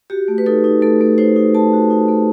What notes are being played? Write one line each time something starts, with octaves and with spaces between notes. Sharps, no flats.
F#4 G4
A3
B4
D#4 A4
D#4
A3 A4
A3
D#4 C5
D#4
A3 A5
F#4
D#4
A3